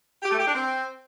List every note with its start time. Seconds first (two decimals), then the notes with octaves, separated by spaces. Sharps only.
0.23 G4
0.31 A3
0.39 G4
0.47 D4
0.55 C4